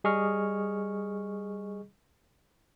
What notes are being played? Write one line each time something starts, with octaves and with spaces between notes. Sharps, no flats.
G3 G#4 D#5 C#6 F6